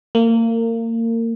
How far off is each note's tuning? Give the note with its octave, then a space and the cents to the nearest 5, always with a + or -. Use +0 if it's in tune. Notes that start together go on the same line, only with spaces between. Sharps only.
A#3 -30